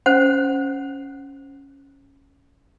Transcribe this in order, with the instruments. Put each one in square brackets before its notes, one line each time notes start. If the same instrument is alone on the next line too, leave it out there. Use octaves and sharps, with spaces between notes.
[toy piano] C#4 C5 F#5